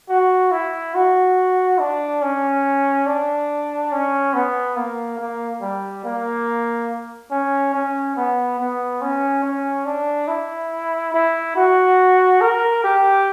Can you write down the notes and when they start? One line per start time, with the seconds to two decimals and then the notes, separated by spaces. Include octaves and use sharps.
0.09 F#4
0.51 E4
0.95 F#4
1.80 D4
2.22 C#4
3.06 D4
3.92 C#4
4.33 B3
4.77 A#3
5.19 A#3
5.62 G3
6.04 A#3
7.31 C#4
7.74 C#4
8.17 B3
8.59 B3
9.02 C#4
9.43 C#4
9.85 D4
10.28 E4
11.14 E4
11.56 F#4
12.41 A#4
12.84 G4